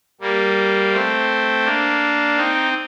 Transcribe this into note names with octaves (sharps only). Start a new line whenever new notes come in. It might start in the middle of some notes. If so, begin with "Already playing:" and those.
G3 A#3
A3 C4
A#3 D4
C4 D#4